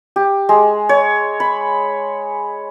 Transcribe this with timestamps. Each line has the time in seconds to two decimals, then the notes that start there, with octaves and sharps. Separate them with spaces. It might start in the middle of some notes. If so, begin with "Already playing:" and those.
0.16 G4
0.49 G#3
0.89 C#5
1.40 B5